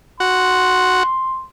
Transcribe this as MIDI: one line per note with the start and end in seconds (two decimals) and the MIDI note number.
0.20 1.03 66
0.20 1.45 84